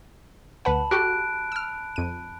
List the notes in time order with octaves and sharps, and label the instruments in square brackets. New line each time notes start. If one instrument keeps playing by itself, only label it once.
[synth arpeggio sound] D2 B4 F#5 [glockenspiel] A5 B5
[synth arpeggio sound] F#4 G4 A4 [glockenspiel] F#6 D7
[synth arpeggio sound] E6 F6
F2 D#7